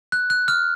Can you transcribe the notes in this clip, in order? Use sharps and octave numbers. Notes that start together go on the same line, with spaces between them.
F#6
F#6
F6